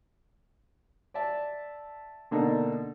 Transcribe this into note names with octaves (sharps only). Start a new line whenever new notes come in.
D5 E5 A5
B2 D3 A#3 D4 D#4 A4